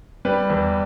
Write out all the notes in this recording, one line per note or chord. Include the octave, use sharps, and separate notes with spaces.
G3 B4
E2